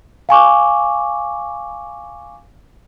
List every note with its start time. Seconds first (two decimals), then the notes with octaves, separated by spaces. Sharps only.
0.29 F5 G#5 C#6 D6